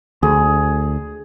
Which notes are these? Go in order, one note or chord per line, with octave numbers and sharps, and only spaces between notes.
D2 G#4